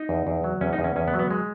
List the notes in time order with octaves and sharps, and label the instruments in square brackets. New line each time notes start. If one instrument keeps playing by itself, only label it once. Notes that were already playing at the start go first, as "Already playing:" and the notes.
Already playing: [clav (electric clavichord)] D#4
E2
E2
F#3
E2 C#4
D#4
E2
C#4
E2 C#4
B3
F#3
B3
G#3